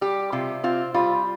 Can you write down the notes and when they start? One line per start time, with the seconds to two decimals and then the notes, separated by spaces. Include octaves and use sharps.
0.01 G3 G4
0.32 C3 F4
0.64 C4 F4
0.94 G3 F4